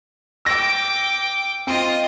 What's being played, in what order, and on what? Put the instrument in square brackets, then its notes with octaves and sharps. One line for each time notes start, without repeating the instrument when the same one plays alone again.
[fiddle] G5 D6 [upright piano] E6 A#6
[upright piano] C4 [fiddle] F4 D#5